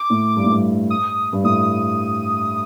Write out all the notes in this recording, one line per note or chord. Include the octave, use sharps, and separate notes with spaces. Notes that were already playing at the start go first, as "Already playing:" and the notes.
Already playing: D6
A2
G2
A2
G2
D#6
G2
A2 D#6